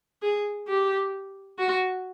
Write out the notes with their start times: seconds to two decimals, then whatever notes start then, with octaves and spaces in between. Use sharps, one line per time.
0.22 G#4
0.68 G4
1.59 F#4